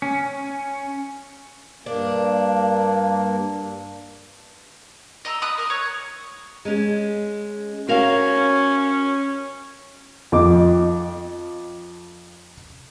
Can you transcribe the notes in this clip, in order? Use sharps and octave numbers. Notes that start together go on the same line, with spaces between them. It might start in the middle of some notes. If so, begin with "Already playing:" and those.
C#4
G2 A#3 D4
D#5 A#5 E6
B5 D#6 F#6
A#4 D#6
C#5
G#3 C#4
C#4 F#4 A#4 F5
F2 D#5 D6